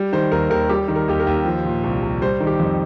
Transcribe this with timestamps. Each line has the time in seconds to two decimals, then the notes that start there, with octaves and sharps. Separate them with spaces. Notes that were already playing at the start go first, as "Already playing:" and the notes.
Already playing: G3
0.13 D#3 C5
0.32 D#2 A#4
0.50 D#2 A#4
0.69 G3 G4
0.88 D#3
0.95 A#4
1.08 D#2 G4
1.20 A#4
1.27 D#2
1.45 F3
1.65 A#2
1.84 C2
2.02 C2
2.22 G3 C5
2.40 D#3
2.47 G4
2.60 F2